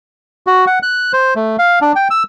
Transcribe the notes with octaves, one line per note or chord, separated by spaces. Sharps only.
F#4
F#5
F#6
C5
A3
F5
D4
G5
E6